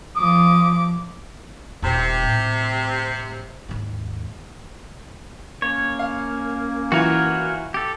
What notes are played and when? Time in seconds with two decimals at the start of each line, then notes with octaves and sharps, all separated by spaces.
0.16 F3 D6 D#6
1.82 D#1 C3
2.23 A2
3.69 D#2 G#2
5.62 A#3 C#4 C#5
5.99 F5
6.92 E3 F4 F#4 A#4 C#5
7.74 G4 A4